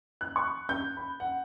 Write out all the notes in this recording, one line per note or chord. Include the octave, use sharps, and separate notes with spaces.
F#6
C#6
G6
B5
F#5